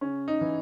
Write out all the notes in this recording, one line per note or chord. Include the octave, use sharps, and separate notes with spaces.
C#3 C#4
D#4
E3